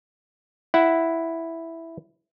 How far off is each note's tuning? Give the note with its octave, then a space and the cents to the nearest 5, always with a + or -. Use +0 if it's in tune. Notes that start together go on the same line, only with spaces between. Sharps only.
E4 +0 F#5 +0